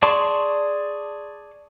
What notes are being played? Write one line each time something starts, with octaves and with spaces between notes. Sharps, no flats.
G#4 D5 A5 C6 C#6